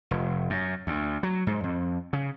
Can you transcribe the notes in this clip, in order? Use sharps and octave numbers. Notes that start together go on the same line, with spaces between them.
F1
F#2
D2
F#3
G#2
F2
C#3